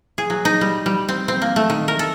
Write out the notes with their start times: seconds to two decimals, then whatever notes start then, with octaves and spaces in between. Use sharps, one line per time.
0.18 G#4
0.30 F#3
0.45 D#4
0.61 G3
0.86 G3
1.09 C4
1.28 C4
1.42 A#3
1.56 A3
1.70 D#3
1.88 A#4
1.99 A4